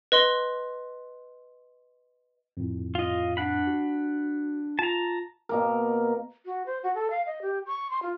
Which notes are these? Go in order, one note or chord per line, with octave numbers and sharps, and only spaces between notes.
B4 D#5 C6 G7
F2 A2
F4 D#5
D4 F#5 B5
F#4
F4 A5 A#5
B2 A#3 A#4
F#4
C5
F#4
A4
F5
D#5
G4
C#6
C6
F4